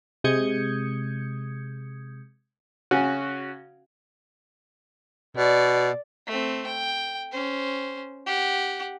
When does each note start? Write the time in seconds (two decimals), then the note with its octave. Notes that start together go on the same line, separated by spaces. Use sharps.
0.24 C3 G#3 D#6 G6 G#6 C#7
2.91 C#3 C#4 F#4 F#5 G#5
5.37 B2 D5
6.27 A3 C4
6.66 G5
7.32 C#4 C5
8.26 G4 F#5